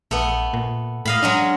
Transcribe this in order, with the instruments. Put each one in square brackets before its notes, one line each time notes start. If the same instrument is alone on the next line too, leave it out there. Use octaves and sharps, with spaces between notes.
[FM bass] A#1 [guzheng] A3 B3
[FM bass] A#2
[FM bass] A2 [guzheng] D#5 F5 B5
[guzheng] F#3 G#3 C#4 [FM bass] D4